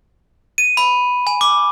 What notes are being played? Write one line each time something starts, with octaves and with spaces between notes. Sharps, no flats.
D#7
B5
G#5
D6